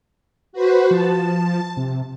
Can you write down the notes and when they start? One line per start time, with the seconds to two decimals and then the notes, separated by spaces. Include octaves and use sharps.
0.53 F#4 B4 C5
0.91 F3 A5
1.77 C3